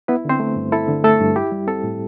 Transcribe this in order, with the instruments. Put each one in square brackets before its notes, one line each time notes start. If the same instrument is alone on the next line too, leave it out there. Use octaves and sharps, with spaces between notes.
[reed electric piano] B3 E4 B4
D3 C4 C5
A3
G2
E4 A4
D3
A3 A4
G2
E4 G4
G3
C4 A4
A2